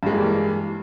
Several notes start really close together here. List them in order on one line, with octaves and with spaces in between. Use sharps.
G2 G#3 A#3 E3 G3